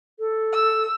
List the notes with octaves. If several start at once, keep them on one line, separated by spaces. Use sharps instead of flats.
A4
E6